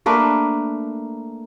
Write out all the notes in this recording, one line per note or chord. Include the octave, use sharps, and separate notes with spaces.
A3 A#3 D4 B4